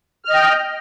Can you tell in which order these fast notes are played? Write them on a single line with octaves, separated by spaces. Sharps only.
F6 D#5 G5